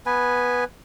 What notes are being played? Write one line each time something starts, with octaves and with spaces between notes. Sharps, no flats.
B3 B4 G#5